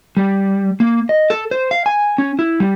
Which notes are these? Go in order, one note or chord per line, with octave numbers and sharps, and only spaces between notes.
G3
A#3
D#5
A4
C5
F5
G#5
C#4
E4
G3